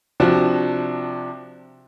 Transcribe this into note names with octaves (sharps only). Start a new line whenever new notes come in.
C3 F3 D4 F#4